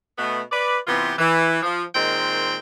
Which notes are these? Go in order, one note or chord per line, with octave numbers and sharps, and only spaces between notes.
B2 A3 B3
B4 D5
C3 E3 B3 F4 G4
E3
F3
A#2 D#3 G#3 C4 G5